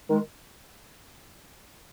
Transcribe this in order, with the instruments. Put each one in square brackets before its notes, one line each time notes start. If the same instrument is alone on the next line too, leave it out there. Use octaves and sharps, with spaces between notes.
[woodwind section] D#3 G#3